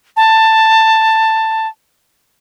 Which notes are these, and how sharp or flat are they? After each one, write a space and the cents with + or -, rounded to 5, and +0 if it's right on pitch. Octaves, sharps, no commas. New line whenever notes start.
A5 +10